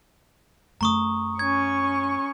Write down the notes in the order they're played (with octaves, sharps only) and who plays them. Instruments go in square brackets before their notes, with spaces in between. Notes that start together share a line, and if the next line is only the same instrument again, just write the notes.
[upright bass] F#2 A3 [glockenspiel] A#5 C#6 D#6
[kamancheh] C#4 C#6 [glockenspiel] G#6